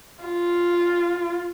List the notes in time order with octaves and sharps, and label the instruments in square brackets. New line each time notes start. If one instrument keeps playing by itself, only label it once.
[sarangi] F4